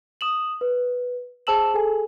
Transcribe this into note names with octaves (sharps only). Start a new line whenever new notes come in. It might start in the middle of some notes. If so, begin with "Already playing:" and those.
D#6 E7 F#7
B4
G#4 C5 A5 E6 E7 F#7
G#4 A4 G#5